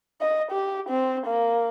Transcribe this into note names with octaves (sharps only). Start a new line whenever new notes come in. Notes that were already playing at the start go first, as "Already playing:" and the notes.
D#5
G4
C4
A#3